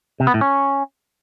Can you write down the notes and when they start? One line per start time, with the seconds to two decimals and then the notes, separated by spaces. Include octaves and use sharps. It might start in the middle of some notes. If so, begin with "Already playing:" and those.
0.20 C3
0.27 B3
0.34 A2
0.41 C#4